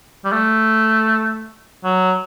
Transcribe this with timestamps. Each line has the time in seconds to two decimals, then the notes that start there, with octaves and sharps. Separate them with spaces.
0.25 G3
0.32 A3
1.84 F#3